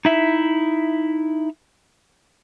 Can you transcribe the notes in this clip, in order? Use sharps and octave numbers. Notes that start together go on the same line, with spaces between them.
D#4 E4 E5